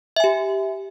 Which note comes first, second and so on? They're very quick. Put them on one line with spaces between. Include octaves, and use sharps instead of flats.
E5 G#5 G4